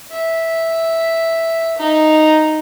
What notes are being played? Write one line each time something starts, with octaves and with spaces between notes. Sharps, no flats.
E5
D#4